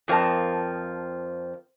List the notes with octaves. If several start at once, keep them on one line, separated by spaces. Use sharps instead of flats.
F2 F3 C4 A#4 A5